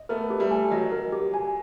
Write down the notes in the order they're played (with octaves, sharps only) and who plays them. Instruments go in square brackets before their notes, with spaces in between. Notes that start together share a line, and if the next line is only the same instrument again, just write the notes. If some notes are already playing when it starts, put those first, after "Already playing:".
Already playing: [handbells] D#5
[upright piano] A3 B3 [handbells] A#4
[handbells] G4
[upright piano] G3 A3
[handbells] G#5
[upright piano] F#3 [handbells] D#5
[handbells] A#4
G4
G#5